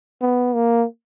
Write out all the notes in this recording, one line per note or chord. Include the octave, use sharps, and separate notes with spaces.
B3
A#3